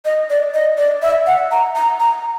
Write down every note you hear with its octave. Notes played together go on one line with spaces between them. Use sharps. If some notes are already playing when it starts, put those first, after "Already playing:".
D#5
D5
D#5
D5
E5
F#5
A#5
A#5
A#5